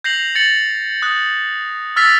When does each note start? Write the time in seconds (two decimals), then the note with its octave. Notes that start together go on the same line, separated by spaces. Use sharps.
0.04 G6 A#6 C7 F7 F#7
0.35 A6 C#7 F#7
1.02 D#6 F#6
1.96 E6 F6 A6 B6 F7